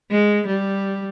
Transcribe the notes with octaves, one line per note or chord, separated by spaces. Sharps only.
G#3
G3